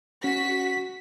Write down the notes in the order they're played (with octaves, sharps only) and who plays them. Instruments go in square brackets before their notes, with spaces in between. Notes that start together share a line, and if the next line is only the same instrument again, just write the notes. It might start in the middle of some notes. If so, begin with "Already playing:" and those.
[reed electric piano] C#4 [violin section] F#4 B6